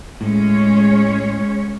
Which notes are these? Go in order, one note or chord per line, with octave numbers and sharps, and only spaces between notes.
A2 G#3 C#4 C#5